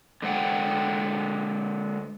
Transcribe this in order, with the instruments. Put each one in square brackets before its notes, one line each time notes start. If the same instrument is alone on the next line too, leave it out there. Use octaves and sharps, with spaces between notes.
[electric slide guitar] D3 G#3 C5 F#5 G5